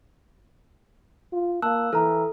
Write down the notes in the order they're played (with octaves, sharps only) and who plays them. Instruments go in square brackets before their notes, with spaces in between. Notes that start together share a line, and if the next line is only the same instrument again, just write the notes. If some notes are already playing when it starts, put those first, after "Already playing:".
[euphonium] F4
[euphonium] A#3 [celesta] F5 A5 [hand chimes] E6 F#6
[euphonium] E3 [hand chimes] A4 [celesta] A#5 E6 F6